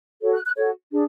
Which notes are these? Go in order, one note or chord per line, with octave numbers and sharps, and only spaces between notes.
F#4 A4 C#5
F#6
F#6
F#4 A4 C#5
D4 G#4